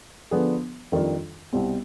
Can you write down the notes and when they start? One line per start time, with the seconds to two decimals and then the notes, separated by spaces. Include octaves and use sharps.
0.31 D3 F3 B3 D4 G#4
0.92 F2 D#3 G3 D4 F4
1.53 C2 B2 G3 C4